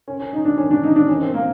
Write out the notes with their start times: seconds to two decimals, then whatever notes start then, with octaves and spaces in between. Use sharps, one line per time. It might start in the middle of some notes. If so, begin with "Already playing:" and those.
0.08 C#4
0.20 C#4
0.33 D#4
0.45 D4
0.58 C#4
0.71 D4
0.84 D#4
0.96 D4
1.09 C#4
1.21 C4
1.34 A#3